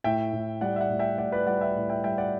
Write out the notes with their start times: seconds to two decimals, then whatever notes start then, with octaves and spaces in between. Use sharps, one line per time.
0.04 A2 E5 G5
0.33 A2
0.61 G3 D5 F#5
0.76 E5
0.80 D5 F#5
0.90 A2
0.99 E5 G5
1.18 A2 D5 F#5
1.32 B4 D5
1.47 G3 D5 F#5
1.61 E5 G5
1.75 A2
1.89 E5 G5
2.04 G3 E5 G5
2.18 D5 F#5